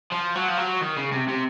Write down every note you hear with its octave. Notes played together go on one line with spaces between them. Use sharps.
F3
F#3
F3
F#3
D#3
C#3
C3
C3